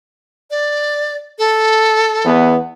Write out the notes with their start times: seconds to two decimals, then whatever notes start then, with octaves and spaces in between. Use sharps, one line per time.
0.50 D5
1.38 A4
2.25 E2 B3